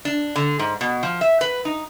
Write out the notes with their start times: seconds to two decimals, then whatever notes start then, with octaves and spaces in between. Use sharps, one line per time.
0.05 D4
0.36 D3
0.59 G#2
0.81 B2
1.03 F3
1.21 E5
1.41 B4
1.65 D#4